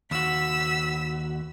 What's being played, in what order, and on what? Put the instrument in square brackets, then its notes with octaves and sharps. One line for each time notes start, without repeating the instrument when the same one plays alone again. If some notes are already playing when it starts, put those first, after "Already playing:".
[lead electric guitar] D#2 F#4 [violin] E6 B6